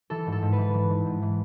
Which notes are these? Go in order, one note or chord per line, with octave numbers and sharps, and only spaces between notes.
E3 A4
G#2
A4
G#2
B4
E3
E3
G#2
G#2
E3